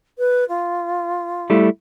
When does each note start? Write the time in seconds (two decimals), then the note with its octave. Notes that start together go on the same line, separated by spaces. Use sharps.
0.18 B4
0.49 F4
1.50 G3 A3 E4